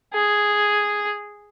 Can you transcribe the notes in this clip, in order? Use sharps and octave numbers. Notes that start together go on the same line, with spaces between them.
G#4